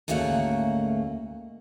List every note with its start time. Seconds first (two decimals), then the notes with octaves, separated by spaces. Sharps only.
0.08 D2 G#2 A3 A#3 C#4 F#5